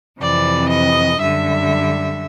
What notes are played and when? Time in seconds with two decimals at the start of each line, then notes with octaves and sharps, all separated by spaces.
0.19 F2 C3 E3 D5
0.70 D#5
1.19 F#2 D3 G3 E5